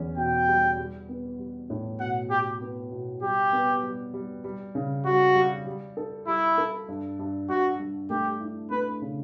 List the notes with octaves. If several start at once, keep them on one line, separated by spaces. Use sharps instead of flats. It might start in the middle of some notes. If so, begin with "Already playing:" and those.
Already playing: E2 C#4
B2 G5
G3
G3
B3
G3
A2
B2 F#5
B2 G4
B3
B2
G3 G4
B3
G3
G3
G3
C#3
G3 F#4
G3
G3
A4
G3 E4
A4
G2
G2
G2 F#4
G2
A3 G4
E4
A3 B4
C#3